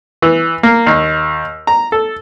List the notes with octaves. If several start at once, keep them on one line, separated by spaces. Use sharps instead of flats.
E3
A#3
D#2
A#5
A4